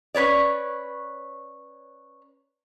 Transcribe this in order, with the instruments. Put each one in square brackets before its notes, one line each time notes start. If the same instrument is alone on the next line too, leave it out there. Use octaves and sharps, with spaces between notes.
[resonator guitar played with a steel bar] C#4 B4 C#5 D5